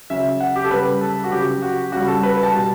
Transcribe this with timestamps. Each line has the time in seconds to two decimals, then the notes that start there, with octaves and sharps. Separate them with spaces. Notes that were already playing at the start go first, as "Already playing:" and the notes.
0.10 C#3 F#3 E5
0.40 F#5
0.56 G4
0.64 A4
0.71 C#3 G3 B4
1.01 A4
1.24 F#4
1.32 C#3 F#3 G4
1.62 F#4
1.92 C#3 G3 F#4
2.08 A4
2.23 B4
2.43 A5
2.53 B2 G3